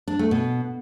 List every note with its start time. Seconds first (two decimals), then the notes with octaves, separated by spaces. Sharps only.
0.08 D4
0.19 A3
0.31 B2